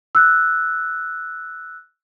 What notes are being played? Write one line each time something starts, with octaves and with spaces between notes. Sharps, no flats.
E6 F#6